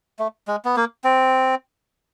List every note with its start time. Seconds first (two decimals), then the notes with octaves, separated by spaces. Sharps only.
0.19 A3
0.48 G#3
0.65 B3
0.76 A#3
1.04 C4